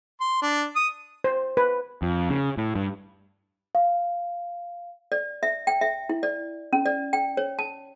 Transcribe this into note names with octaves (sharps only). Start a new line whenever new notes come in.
C6
D4
D#6
C5
B4
F2
C#3
A2
G2
F5
D5
E5
G5
E5
E4
D5
C#4
D5
G5
C#5
A5